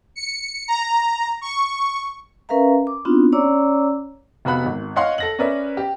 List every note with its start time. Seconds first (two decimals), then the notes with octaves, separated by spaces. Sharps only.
0.16 C#7
0.68 A#5
1.41 C#6
2.49 C#4 A#4 B4 E5 F5 A#5
2.87 D6
3.05 B3 C4 D4 D#4 F4 F#4
3.33 C#4 C#5 D5 A#5 D6 E6
4.45 F1 B3 F#4 F5 B5 F#6
4.66 G#1
4.96 C#5 D#5 F5 F#5 C6
5.18 A4 A#6 F#7
5.39 C#4 A#4 B4 D5 E5
5.77 G4